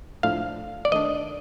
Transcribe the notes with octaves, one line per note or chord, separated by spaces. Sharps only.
A2 F3 A3 D4 F5
D5
D#3 A3 D4 D#5